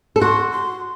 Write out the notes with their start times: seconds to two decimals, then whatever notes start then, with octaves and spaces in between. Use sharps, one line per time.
0.16 A4
0.21 F#4 C6
0.51 C6